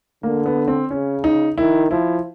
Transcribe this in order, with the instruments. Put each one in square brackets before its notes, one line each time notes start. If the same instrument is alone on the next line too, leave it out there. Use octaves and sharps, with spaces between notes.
[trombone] D3 [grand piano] A#3
[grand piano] B3
C4
[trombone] C#3 [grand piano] C#4
[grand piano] D#4
[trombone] D#3 [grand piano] E4
[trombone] F3 [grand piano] E4